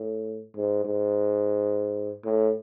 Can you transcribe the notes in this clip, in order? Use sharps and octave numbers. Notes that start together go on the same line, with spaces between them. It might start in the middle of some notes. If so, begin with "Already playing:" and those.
Already playing: A2
G#2
G#2
A2